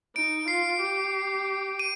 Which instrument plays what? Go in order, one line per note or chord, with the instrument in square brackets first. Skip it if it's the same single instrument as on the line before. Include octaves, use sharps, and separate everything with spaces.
[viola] D#4 [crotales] D7
[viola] F4 [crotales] C7
[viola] G4
[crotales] D#7